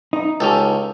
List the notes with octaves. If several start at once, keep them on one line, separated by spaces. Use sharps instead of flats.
D#4
C#2 C#4 G4 A4